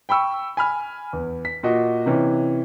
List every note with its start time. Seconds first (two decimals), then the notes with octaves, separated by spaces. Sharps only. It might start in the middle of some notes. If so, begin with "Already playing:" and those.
0.09 G5 B5 C#6 E6
0.57 G#5 B5 F6
1.13 E2
1.45 B6
1.63 A#2 F#4 D#5
2.06 C3 E3 C#4